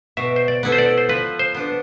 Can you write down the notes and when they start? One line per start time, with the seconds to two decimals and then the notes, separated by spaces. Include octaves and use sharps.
0.17 B2 E5
0.36 C5
0.48 D5
0.63 B3 E4 A4
0.72 C5
0.78 D5
0.98 C5
1.09 F3 B4
1.39 C5
1.55 B3 D4